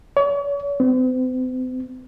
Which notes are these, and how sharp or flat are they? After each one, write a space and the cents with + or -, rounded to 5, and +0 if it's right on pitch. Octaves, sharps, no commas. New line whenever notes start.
C#5 +40
C4 -45